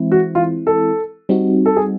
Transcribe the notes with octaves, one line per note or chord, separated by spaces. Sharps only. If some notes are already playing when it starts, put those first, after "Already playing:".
Already playing: E3 G#3 C4 E4
F#4
F4
A4
G3 C4 D#4 F#4
A4
G#4